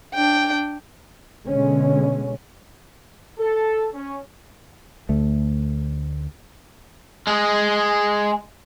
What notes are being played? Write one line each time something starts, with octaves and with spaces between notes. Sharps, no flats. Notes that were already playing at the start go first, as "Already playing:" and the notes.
D4 G5
B2 D3 G#3 C#4
A4
C#4
D2 A3
G#3 G#4